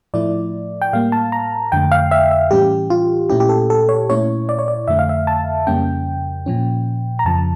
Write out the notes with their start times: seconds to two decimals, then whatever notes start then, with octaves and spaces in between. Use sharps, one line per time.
0.14 A2 F3 A3 E4 D5
0.82 G5
0.93 A2 G3 A#3 F5
1.12 A5
1.32 A#5
1.72 F2 D3 A3 G5
1.92 F5
2.11 E5
2.31 E5
2.51 A2 E3 G3 C#4 G4
2.90 F4
3.30 A#2 A3 C#4 E4 G4
3.40 G4
3.49 A4
3.70 A4
3.89 C#5
4.10 A#2 A3 C#4 E4 C#5
4.49 D5
4.59 C#5
4.68 D5
4.88 F2 D3 A3 E5
4.99 F5
5.09 E5
5.27 A5
5.67 F2 C#3 G3 A#3 C#4 G5
6.46 A#2 F3 C#4
7.19 A#5
7.25 F2 C#3 F3 A5